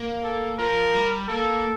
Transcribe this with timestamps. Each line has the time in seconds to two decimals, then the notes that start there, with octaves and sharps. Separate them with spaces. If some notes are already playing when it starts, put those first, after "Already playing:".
Already playing: A#3
0.24 A4
0.59 F3 A#4
0.94 G3
1.28 A#3 A4